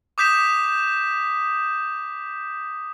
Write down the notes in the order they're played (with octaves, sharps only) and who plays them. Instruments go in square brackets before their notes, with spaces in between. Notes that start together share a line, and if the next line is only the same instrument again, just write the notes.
[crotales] D6 D#6 G6 B6 E7